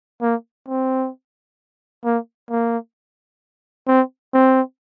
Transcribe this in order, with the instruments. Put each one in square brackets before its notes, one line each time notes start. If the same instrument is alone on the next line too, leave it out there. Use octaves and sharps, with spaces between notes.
[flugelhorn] A#3
C4
A#3
A#3
C4
C4